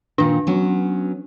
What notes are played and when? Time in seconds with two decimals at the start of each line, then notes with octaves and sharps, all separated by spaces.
0.18 A#2 D#3 D4
0.47 F#3 B3 C#4